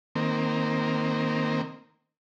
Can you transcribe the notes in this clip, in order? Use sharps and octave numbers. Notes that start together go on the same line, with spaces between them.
D#3 A#3 C4